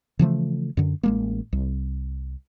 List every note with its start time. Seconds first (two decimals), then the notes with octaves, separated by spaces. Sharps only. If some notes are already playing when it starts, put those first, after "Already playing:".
0.19 C#3 E3 F3 A3
0.77 F#2 D3
1.03 A1 G#3 A#3
1.53 C2